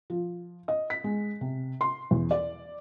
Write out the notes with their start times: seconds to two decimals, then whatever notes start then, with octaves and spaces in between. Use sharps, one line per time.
0.10 F3
0.68 D#5
0.90 B6
1.04 G#3
1.41 C3
1.81 C6
2.11 E2
2.31 D5